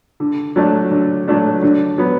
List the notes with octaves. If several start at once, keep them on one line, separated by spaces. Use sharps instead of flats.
D3
F#3 A3 D4
D3
F#3 A3 D4
D3
F#3 B3